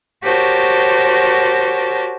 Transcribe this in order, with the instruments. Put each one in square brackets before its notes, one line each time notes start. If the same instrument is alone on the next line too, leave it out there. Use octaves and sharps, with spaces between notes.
[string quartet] F#4 G4 A#4 C5 C#5 A5